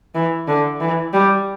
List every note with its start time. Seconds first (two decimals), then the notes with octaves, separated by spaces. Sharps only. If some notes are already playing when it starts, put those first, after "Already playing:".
0.15 E3
0.48 D3
0.81 E3
1.13 G3